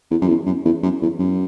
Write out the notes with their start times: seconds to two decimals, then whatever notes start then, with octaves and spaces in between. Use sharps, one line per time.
0.11 E2
0.22 F#2
0.29 E2
0.46 F#2
0.65 E2
0.83 F#2
1.02 E2
1.19 F#2